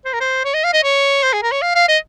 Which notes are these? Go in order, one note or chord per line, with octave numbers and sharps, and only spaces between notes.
C5
A#4
C5
C#5
D#5
F5
D#5
C#5
C5
G#4
A#4
C#5
F5
F5
D#5